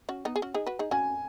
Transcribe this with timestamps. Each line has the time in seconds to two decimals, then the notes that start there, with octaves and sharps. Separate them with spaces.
0.09 C#4 F#4
0.25 B3 D#4
0.36 G#4
0.42 C#4 F#4
0.54 D#4 G#4
0.66 F#4 B4
0.79 D#4 G#4
0.91 C#4 F#4 G#5